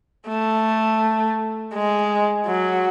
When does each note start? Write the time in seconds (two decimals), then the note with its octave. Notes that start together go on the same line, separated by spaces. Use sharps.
0.28 A3
1.74 G#3
2.47 F#3